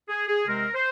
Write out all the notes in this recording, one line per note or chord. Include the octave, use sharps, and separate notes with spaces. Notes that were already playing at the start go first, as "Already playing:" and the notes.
G#4
G#4
C3 G#3 C4 A#4
C5